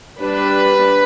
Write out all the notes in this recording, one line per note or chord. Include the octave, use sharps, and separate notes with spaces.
G3 D4 B4